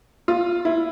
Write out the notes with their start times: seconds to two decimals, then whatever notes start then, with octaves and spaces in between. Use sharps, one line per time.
0.28 F4
0.65 E4